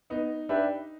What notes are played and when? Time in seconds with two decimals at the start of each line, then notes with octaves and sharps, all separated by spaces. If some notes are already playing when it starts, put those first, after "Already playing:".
0.10 B3 D#4
0.49 D4 G4 B4 E5